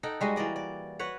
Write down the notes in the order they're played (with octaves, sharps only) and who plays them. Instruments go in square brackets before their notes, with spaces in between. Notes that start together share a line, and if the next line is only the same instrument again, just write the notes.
[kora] D#4 A4 F#5 G5
G3 G#3 F#4 D#5
E3 A#3 D5 D#5
D5
F#4 B4 C#5 F#5